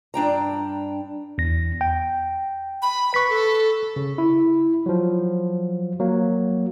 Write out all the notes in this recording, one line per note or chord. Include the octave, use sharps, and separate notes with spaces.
G2 D4 G5 A#5
E2 A#6
G5
B5
B4 C#6 B6
A4
C#3
E4
F3 F#3
F#3 A#3